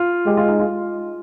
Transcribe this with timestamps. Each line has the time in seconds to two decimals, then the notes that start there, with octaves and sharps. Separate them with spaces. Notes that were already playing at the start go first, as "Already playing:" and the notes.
Already playing: F4
0.26 G#3 G4
0.37 F4
0.48 D#4
0.59 F4